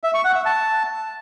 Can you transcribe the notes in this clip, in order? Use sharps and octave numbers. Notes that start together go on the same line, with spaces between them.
E5
C#6
F#5
E5
A5